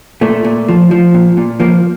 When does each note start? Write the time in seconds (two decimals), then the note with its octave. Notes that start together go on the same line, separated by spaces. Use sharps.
0.21 A#2 A3
0.45 A#2
0.68 F3
0.91 F3
1.14 A#2
1.37 A#2
1.60 F3 A#3